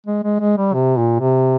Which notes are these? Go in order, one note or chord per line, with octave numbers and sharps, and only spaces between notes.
G#3
G#3
G#3
G3
C3
A#2
C3